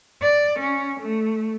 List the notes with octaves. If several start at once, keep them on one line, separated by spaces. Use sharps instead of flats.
D5
C#4
A3